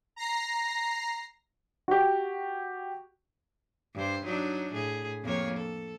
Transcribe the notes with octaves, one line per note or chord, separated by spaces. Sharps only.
A#5 A#6 C7
F#4 G4
G2 C5
F#3 D4 D#4
A2 G#4
F2 A#3 C#5
A4